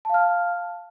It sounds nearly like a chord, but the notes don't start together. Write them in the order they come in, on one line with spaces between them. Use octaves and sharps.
A5 F5 F6